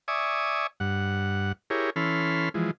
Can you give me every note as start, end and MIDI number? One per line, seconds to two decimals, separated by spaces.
0.08 0.67 74
0.08 0.67 76
0.08 0.67 80
0.08 0.67 85
0.08 0.67 87
0.80 1.52 43
0.80 1.52 78
1.70 1.90 64
1.70 1.90 67
1.70 1.90 68
1.70 1.90 70
1.70 1.90 73
1.96 2.49 52
1.96 2.49 61
1.96 2.49 69
1.96 2.49 83
1.96 2.49 84
1.96 2.49 89
2.54 2.71 52
2.54 2.71 53
2.54 2.71 56